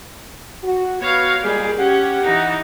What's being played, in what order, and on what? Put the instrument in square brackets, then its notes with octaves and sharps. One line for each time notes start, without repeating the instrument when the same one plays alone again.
[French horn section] F#4
[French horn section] B3 [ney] F#4 [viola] C#5 F5
[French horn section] A#2 G#3 A#3 [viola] G3 [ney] G#4
[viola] C#4 [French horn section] G4 [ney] F#5
[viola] E3 D#4